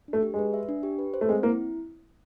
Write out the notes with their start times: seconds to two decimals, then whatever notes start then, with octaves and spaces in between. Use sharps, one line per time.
0.08 D4
0.13 A3
0.23 G4
0.34 G#3 B4
0.54 E5
0.69 D4
0.83 G4
0.99 B4
1.14 C5
1.21 A3
1.29 G#3 C4
1.43 A#3 E4